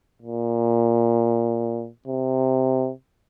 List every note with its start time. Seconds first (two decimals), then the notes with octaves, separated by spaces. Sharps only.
0.22 A#2
2.07 C3